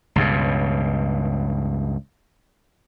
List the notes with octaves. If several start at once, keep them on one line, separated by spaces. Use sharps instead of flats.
C#2 G2 B2